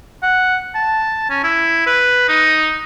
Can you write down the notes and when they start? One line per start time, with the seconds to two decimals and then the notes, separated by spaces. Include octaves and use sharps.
0.23 F#5
0.75 A5
1.30 C#4
1.43 E4
1.87 B4
2.28 D#4